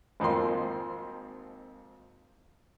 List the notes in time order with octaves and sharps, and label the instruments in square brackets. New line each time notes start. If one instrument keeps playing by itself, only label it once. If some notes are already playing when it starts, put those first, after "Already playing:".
[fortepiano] G#1 F2 F3 A#3 C6